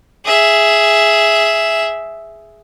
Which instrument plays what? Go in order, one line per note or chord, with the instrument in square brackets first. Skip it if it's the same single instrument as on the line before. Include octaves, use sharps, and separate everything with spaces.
[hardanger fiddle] G#4 E5